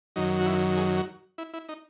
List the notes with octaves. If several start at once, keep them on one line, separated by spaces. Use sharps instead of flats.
F#2 D#3 F#3 D#4
F#4
E4
G#4
F#4
E4
E4
D#4